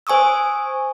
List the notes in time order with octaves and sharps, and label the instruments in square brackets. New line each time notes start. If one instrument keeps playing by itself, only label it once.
[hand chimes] C5 G#5 C#6 D#6 E6